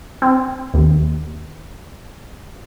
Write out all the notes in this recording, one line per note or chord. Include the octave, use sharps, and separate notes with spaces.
C4
D#2